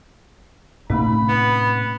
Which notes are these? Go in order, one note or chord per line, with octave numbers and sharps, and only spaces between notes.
A2 C3 A3 A#3 C#4 D#4 B5
B3